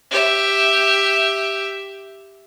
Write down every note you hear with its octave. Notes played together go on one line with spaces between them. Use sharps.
G4 E5